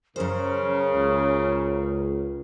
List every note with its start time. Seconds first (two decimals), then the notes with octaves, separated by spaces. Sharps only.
0.16 F#2 C#3 A#4 C5
0.94 C#2